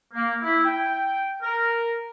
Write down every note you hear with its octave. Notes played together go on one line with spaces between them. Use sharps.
A#3
E4
G5
A#4